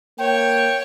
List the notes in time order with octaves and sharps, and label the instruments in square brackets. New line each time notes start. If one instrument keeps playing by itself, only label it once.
[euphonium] A#3 [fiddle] C#5 [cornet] G5